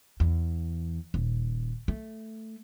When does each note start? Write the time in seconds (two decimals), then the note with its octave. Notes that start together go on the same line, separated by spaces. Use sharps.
0.20 E2
1.14 D#1
1.88 A3